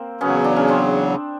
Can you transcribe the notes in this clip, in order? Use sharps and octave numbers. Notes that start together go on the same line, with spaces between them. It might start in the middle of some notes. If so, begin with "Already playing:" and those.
Already playing: A#3 C4
E2 C#3 F#3 B3 C#4
D4
C#4
C4 D4